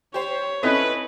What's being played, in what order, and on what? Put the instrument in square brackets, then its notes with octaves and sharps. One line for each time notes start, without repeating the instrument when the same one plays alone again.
[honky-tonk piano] G4 C5 [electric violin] C#5
[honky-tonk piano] C4 A4 [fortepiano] C#4 E4 D#5 [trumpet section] B4